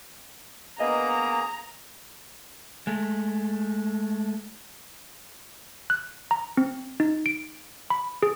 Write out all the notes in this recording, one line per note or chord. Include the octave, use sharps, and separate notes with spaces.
A#3 B3 D4 G#4 D#5 F5 A#5
G#3 A3
F#6
A#5
C4
D#4
D7
B5
G#4